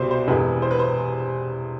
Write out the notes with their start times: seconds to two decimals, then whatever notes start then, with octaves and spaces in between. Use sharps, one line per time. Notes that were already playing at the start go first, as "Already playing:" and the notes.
Already playing: C2 B2 G3 B3 C5
0.11 C5
0.28 E1 E2 C3 B4
0.62 C5
0.71 B4
0.79 C5